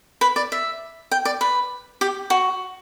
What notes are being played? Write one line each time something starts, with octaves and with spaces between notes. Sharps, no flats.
B4
D5
E5
G5
D5
B4
G4
F#4